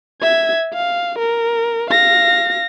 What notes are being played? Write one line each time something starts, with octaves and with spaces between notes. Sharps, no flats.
E5 G#6
F5
A#4
F5 A#6